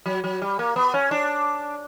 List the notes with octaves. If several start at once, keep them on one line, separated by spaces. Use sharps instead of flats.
F#3
F#3
G3
A#3
B3
C#4
D4